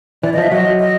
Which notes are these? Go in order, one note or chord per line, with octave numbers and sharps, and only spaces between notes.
E3 D5
D#5
F3 E5
F#3 D#5
D#5